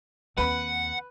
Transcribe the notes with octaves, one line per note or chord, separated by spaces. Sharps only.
D#2 C4 B4 F#5 B5